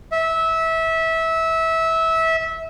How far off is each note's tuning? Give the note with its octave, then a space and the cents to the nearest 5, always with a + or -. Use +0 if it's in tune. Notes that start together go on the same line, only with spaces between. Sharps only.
E5 -20